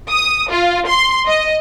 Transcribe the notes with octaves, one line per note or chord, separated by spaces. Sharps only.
D#6
F4
C6
D#5